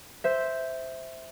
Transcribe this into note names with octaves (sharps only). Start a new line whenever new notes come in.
C5 E5